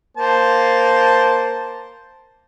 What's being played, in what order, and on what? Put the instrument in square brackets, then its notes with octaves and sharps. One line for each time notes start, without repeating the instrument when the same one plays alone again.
[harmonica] A#3 C5 A5